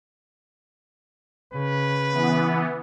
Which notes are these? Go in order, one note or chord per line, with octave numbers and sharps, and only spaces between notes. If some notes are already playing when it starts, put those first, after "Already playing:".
C#3 B4
E3 B3